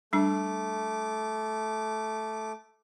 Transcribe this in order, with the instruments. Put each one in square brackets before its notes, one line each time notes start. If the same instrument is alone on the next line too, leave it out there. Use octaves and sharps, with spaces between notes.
[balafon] G3 D4 [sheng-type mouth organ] A3 D6